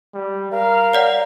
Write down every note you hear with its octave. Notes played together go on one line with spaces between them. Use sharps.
G3
A#4 F5
C#5 D5 F#5